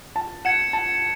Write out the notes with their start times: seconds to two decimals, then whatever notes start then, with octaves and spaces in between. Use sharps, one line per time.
0.16 A5
0.45 F#5 G#6 C#7 E7
0.73 A5